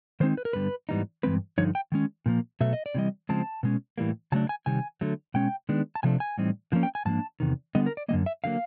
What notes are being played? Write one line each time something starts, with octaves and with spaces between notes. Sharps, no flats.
D#3 G#3 C4 D#4 C5
B4
A#4
G2 D3 G3 B3 B4
G#2 E3 G3 B3 D#4
G2 E3 G#3 C4 B4
G2 D3 F3 D#4 C#5
G5
D#3 G#3 C#4
A#2 F3 A#3
B2 F#3 A3 E5
D#5
D5
C3 E3 G3 D#5
C#3 F3 G#3 C4 A5
B2 G#3 C#4
A2 E3 G3 A#3
C#3 F#3 A3 D4 A5
G#5
C3 D#3 G3 G#5
D3 F#3 A3
B2 G#3 C#4 G5
D#3 G#3 B3 D4
A5
C3 F3 A3 D4 G#5
G#5
A2 E3 G3 C4 D#4
D3 F3 A#3 C#4
G5
G#5
G#2 F3 A#3 D4 A5
E2 C3 D#3
D3 G3 B3 D#5
A#4
D5
F#2 D3 G3 A#3 D#5
E5
D3 F#3 A#3 F5